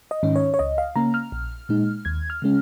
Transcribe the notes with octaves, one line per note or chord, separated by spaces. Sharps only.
D#5
G#2 D#3 C#4
C#5
C#5
C#2 D#5
F5
C#3 A#3 C#4 A#5
F6
A#1
A#2 G#3 D#4
D#2 G#6
F6
C#3 G#3 C#4